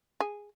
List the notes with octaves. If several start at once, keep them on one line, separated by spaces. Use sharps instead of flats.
G#4